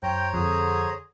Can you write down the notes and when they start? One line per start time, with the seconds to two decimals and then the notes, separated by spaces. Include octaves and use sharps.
0.03 F#2 C5 C#5 G5 A#5
0.34 F2 D3 G#4